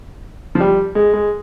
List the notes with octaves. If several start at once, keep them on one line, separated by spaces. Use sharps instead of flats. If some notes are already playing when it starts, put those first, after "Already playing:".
F3
G3
G#3
G#3